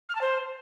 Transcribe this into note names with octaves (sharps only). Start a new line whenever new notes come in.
F6
A5
C5